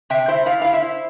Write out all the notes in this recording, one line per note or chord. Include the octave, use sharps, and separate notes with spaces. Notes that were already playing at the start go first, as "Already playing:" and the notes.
C3 E5 G5
E4 C5 E5
E4 D5 F5
E4 F5
C5 E5
E4